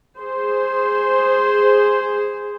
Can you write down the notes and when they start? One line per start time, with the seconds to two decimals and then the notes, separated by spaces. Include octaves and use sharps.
0.20 G#4 C5